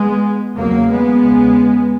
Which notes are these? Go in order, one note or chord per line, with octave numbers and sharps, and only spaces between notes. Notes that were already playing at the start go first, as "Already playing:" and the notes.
Already playing: G#3 B3
E2 C#3 F#3 A#3
G#3 B3
E2 C#3